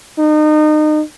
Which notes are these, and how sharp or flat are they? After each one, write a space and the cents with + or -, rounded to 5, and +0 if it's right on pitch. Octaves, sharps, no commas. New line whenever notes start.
D#4 -30